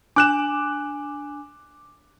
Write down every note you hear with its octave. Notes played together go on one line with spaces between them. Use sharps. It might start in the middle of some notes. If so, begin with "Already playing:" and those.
D4 G#5 D6 F#6 E7